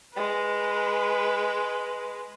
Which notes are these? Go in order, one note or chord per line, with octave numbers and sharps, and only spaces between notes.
G#3 B4